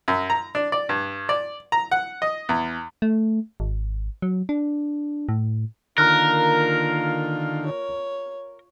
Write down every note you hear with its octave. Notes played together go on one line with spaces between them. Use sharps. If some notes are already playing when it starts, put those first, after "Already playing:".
F#2
A#5
D4
D5
G2
D5
A#5
F#5
D#5
E2
A3
G#1
F#3
D4
A2
D3 D#3 A#3 F4 A#4 A#5 F6 F#6
C#5